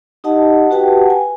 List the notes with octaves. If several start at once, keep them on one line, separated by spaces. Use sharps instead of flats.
D#4 G4 D#5 F#5 A5
F#4 G4 B4 F#5 G5 A5
G#5